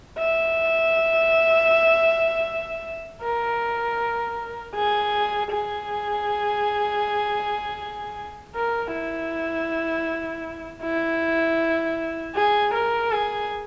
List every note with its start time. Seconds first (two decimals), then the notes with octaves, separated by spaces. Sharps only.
0.19 E5
3.23 A#4
4.75 G#4
5.52 G#4
8.55 A#4
8.93 E4
10.83 E4
12.36 G#4
12.75 A#4
13.12 G#4